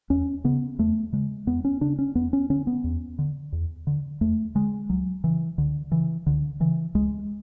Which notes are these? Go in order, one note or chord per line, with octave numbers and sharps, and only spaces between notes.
E2 C#4
C#3 B3
E2 A3
C#3 G#3
E2 B3
C#4
C#3 D4
C#4
E2 B3
C#4
D3 C#4
B3
E2
D3
E2
D3
E2 A3
D3 G#3
C#2 F#3
C#3 E3
C#2 D3
C#3 E3
C#2 D3
C#3 E3
C#2 G#3